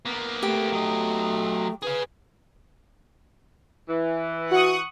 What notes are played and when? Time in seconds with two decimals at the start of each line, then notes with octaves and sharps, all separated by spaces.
0.05 A#3 B3
0.43 A3 G4
0.72 F#3 D#5
1.82 G#4 B4 F5
3.88 E3
4.51 F#4 F#5 C#6 D#6